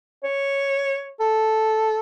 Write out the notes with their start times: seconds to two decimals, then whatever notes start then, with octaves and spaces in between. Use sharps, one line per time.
0.24 C#5
1.20 A4